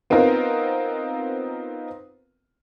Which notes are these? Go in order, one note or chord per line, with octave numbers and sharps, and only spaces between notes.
B3 C4 D#4 F4 A#4